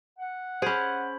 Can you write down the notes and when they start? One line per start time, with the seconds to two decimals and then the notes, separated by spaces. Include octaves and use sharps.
0.19 F#5
0.62 C#4 G#4 C5 B5